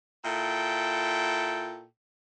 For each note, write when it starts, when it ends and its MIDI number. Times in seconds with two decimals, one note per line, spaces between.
0.24 1.85 46
0.24 1.85 64
0.24 1.85 69
0.24 1.85 79